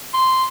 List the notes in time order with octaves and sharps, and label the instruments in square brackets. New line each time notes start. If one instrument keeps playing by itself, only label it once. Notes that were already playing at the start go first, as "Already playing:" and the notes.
[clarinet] C6